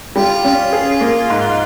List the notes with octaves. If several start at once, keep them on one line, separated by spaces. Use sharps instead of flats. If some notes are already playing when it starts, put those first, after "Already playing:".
G3 F4
C#4
G#4
A#3
G#2